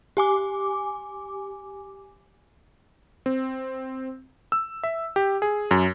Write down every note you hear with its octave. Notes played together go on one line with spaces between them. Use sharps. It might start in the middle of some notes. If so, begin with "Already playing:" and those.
G4 G#5 D6
C4
E6
E5
G4
G#4
F#2